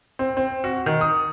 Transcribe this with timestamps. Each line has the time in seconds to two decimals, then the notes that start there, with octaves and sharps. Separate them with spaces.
0.19 C4
0.37 C4
0.64 F#4
0.86 D#3
1.01 D#6